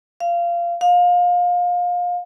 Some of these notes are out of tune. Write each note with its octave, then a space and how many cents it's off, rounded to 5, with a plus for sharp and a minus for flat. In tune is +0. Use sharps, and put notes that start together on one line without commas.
F5 -20
F5 +25